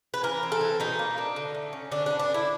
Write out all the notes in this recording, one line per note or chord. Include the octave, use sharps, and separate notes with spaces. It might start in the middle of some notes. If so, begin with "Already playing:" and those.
B4
E3 A#4
C4
A4
E3
B2 D#4
A#3
D4
D3
A3
C#4
D3 D4
B3 D4
D4
D3 E4